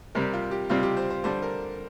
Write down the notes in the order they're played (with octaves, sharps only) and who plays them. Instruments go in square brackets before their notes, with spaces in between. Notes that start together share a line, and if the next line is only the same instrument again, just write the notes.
[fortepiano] C3 G3 C4 [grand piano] A#4
[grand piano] F4
G4
[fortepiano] C3 G3 C4 [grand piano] F4
[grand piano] G4
C5
C5
[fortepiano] D3 G3 D4 [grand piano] C5
[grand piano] A#4